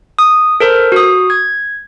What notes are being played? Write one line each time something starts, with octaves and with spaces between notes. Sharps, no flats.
D#6
A4 A#4 C5
F#4 D#6
G#6